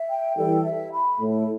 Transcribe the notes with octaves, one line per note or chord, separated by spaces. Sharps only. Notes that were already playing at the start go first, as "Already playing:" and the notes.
Already playing: E5
G5
E3 G3 A4
E5
B5
A2 E4